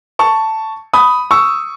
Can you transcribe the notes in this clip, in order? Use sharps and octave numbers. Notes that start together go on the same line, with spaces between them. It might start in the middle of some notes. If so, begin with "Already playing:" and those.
A5 C#6
B5 D#6
C#6 E6